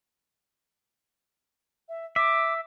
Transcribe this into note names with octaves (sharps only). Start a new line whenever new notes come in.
E5
E5 D6